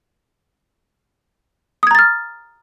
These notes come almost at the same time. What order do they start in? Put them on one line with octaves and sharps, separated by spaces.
D#6 G#6 A#5 A6 F6